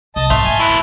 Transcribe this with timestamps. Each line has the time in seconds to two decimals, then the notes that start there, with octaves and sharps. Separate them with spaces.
0.16 C2 D#5 A5
0.30 G#1 G2 A3 F4
0.45 F#2 A#3 G#5
0.59 B2 E3 E4